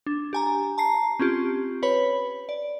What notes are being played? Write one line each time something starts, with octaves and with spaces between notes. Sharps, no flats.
D4
G4 G#5 A#5
A5 A#5 C7
C4 C#4 F4 G4
B4 C#5 B5
D5